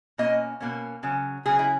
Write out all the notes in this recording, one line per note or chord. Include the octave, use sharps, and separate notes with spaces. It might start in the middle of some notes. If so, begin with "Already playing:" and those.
B2 A#3 C#4 D#5
B2 A#3 C#4
C#3 F#3 C#4
C#3 F#3 C#4 G#4
E4